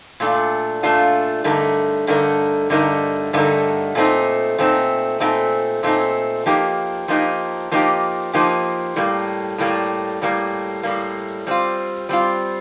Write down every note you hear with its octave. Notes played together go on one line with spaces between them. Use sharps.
A#2 A3 D4 F4
A#2 A3 D4 F4
G2 D3 A3 D#4 A#4
G2 D3 A3 D#4 A#4
G2 D3 A3 D#4 A#4
G2 D3 A3 D#4 A#4
A#2 A3 C4 D#4
A#2 A3 C4 D#4
A#2 A3 C4 D#4
A#2 A3 C4 D#4
F3 A#3 D#4 G4
F3 A#3 D#4 G4
F3 A#3 D#4 G4
F3 A#3 D#4 G4
A2 G3 A#3
A2 G3 A#3
A2 G3 A#3
A2 G3 A#3
G3 C4 F4
G3 C4 F4